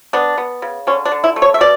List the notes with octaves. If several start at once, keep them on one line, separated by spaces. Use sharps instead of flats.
B3 D4
B3
C#3
D3 C#4
D4
D3
E4
A3
C#5
E5
B2 D5